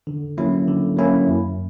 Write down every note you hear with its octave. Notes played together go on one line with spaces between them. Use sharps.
D3
F#3 A#3 C#4 E4
D3
F#3 A#3 C#4 E4
F#2